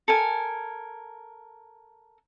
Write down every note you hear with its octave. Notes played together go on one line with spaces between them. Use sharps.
A4 A#4 G#5